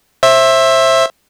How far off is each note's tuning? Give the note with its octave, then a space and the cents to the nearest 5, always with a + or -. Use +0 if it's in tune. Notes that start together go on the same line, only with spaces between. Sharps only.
C5 +30 E5 +0